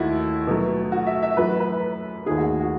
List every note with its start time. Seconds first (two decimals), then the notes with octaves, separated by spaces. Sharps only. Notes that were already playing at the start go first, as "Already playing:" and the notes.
Already playing: D#2 D#3 A3 E4 F#4
0.47 B2 F#3 A3
0.92 F#4
1.07 E5
1.22 E5
1.37 F#2 E3 A3 B4
1.60 B4
2.26 D#2 D#3 A3 G#4
2.38 F#4
2.60 F#4